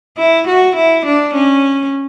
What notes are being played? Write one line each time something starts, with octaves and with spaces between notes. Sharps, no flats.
E4
F#4
E4
D4
C#4